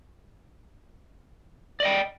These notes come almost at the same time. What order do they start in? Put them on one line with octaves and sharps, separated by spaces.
D5 D#5 G5